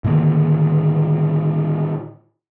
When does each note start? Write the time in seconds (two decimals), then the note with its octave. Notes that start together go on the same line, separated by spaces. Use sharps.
0.04 A2 D3 D#3 A#3